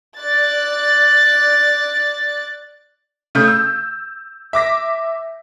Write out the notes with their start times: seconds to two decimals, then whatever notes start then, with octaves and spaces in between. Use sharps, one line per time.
0.19 D5 F#6 A6
3.35 C#3 A3 D#6 G6
3.48 E6
4.53 E5 D6 A#6 B6